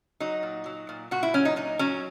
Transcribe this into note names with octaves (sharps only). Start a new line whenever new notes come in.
F#3 D#4
A#2
F#3
A#2
A#2 F#4
E4
F#3 C#4
D#4
A#2 D#4
F#3 C#4